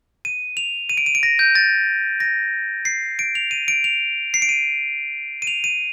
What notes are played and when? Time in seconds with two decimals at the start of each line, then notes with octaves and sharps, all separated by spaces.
0.25 D#7
0.57 F7
0.89 D#7
0.97 D7
1.06 D#7
1.15 D7
1.23 A#6
1.39 G6
1.55 A6
2.20 A#6
2.85 C7
3.19 D7
3.35 F7
3.51 D#7
3.68 D7
3.84 F7
4.34 C7
4.42 D7
4.49 D#7
5.42 D#7
5.47 F7
5.64 D#7